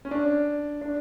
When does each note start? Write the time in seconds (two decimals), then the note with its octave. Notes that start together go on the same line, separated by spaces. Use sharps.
0.05 C#4
0.11 D4
0.81 D4